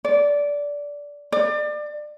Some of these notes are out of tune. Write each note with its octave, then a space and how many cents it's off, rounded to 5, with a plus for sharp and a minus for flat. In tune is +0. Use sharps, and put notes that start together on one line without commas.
D5 -15
D5 +30